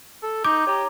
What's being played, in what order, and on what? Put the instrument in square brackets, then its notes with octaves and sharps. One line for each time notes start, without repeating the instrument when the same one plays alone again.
[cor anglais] A4
[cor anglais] D#4 [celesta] D6 [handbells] G6
[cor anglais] G4 [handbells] C#5 A#5